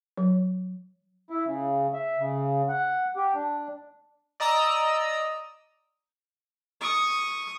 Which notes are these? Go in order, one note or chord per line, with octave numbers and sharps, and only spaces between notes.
F#3
E4
C#3
E5
C#3
F#5
G4
D4
D5 D#5 A#5 D#6 E6
C#6 D#6